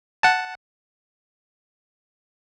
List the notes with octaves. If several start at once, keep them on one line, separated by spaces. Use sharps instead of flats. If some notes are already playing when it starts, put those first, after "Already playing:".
F#5 A5